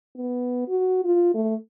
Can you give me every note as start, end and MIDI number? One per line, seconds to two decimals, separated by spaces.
0.17 0.68 59
0.68 1.03 66
1.04 1.32 65
1.34 1.55 57